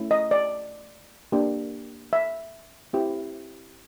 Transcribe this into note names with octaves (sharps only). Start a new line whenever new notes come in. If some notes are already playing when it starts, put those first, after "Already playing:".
Already playing: A3 C#4 E4
D#5
D5
A#3 D4 G4
E5
C4 E4 G4